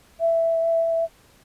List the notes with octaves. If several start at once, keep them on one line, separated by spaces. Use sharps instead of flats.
E5